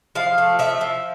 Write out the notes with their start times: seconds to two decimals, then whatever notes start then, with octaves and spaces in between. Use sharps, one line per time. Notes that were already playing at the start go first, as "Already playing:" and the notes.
0.15 F3 F5
0.38 A3
0.59 F3 E5
0.81 F3